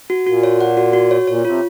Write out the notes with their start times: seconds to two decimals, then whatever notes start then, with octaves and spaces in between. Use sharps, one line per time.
0.10 F#4
0.26 A#2 F#4
0.43 C#5
0.61 F#5
0.77 F#4
0.93 F#4
1.11 C#5
1.27 A#2 C#5
1.45 C3 F4